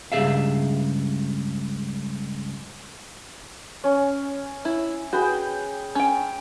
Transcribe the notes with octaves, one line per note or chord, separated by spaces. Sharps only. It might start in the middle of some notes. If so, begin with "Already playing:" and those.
C#2 G2 D#3 G#4 E5 F5
C#4
E4
F#4 G#4 B4 G5
C#4 G5